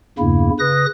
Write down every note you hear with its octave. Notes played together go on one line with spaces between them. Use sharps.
E2 G2 C#3 A#3 E4
C#3 B4 D#6 F#6 A#6